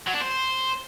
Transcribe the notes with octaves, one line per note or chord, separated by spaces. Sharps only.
F#3
D4
C5